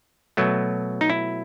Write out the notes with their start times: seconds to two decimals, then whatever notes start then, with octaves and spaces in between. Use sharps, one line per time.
0.37 B2 F#3 A3
1.01 D#4
1.10 E4